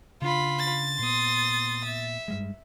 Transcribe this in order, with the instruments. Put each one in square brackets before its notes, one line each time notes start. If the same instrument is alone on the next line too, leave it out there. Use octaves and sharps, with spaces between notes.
[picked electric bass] C#3 D4 [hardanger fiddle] F4 B5
[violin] A6
[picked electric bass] A#2 B3 [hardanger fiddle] C6 D#6
[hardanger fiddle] E5
[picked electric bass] G2 G3 G#3